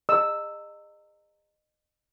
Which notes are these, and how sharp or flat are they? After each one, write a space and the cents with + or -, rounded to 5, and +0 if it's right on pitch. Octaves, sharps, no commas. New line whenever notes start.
D#5 -30 E6 +0